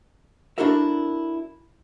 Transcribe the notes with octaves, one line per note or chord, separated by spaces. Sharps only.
D4 E4 F#4 A4 A#4 E5